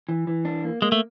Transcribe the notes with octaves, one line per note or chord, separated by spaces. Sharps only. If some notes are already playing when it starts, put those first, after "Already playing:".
E3
E3
D4
A#3
G#3 A#3
A3